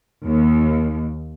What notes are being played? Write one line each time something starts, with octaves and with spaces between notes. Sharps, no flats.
D#2